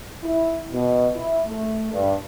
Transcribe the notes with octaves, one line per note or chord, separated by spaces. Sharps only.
E4
B2
E4
A3
G2